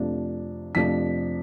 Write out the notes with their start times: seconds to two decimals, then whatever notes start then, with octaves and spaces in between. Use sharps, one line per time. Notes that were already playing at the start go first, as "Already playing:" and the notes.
Already playing: F2 C3 F3 A3 D4
0.75 F2 C3 F3 A3 D4 B6